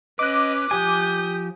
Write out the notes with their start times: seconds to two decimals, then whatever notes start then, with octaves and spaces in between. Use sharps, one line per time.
0.19 C#4 B4 D#5 D6 F#6
0.71 F3 G4 G#5 D#6 G6